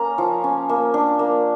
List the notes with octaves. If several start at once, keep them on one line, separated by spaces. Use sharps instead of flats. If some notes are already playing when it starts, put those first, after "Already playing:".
Already playing: A#3 C#4 A#5
F3
C#4
A#3
D4
A#3